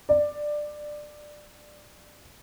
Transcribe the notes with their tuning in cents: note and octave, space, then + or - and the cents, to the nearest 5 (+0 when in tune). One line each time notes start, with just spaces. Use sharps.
D5 +15